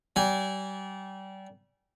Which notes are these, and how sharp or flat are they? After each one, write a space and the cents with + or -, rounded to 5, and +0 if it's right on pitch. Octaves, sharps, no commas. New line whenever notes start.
G3 -30 G#5 -25